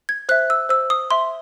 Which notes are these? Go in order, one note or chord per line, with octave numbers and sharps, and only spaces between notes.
G#6
C5 E5 F#6
E6
C5 E6
D#6
E5 C6